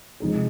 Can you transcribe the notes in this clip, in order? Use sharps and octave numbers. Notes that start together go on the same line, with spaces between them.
C3 F3 G#3 D#4 G#4